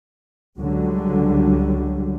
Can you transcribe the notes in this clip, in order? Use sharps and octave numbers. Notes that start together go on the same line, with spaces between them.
C#2 D3 F#3 G3